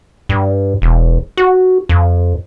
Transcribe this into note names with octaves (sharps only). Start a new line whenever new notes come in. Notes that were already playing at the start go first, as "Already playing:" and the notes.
G2
E1
F#4
F2